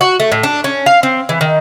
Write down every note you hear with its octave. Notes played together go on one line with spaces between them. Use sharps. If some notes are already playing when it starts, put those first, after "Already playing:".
F#4
A3
A2
D4
C#4
F5
C4
E3
D#3